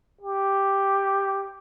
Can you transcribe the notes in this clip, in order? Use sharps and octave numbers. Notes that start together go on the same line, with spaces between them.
G4